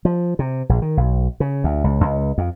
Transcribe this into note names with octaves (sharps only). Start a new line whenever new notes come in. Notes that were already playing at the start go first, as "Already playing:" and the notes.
F3
C3
A#1
D#3
B1
C#3
D2
C#2
C#2
F2